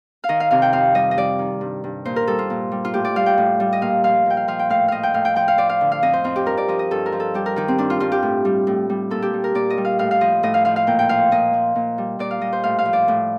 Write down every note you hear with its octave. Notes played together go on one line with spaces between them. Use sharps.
F5
D#3 D#5
F5
C3 F5
G5
F2 F5
G3 D#5
D#5
G3 D5
D#3
G2
G2
A#2 C5
A#4
G3 A4
F4
A#2
G3
F4
A2 G4
D5
G3 F5
G5
A2
G3
D#5
A#2 F5
F3 F5
A#2 G5
F5
F3 F5
G5
A2 F5
F3 D#5 F5
G5
A2 F5
G5
F3 G5
F5
F3 D5
F5
D3
F5
F2 D#5
C5
F2 F4
G4
G2 A#4
D5
F3 D#5
D#5
G2 A4
A#4
F3
A4
G3 G4
A#4
D#3 G4
C4
G2 D4
F4
G2 F4
G4
A2
G3
A2
G3
A#2 A4
G4
G3
A#4
A#2 D5
D#5
G3
F5
A2 F5
F5
F3 D#5
A2 D#5
F5
F3 F5
F5
A#2 G5
G5
F3 F5
A#2 D#5
F3
A#2
G3
A#2 D5
F5
G3 D#5
C5
A2 F5
F5
F3
D5
A2